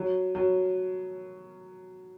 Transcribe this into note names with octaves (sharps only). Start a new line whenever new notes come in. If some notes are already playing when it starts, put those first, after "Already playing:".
Already playing: F#3
F#3